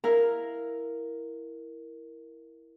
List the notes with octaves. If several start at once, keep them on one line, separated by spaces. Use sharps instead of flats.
E4 A#4 F5